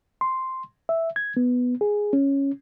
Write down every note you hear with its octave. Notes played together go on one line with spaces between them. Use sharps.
C6
E5
G#6
B3
G#4
C#4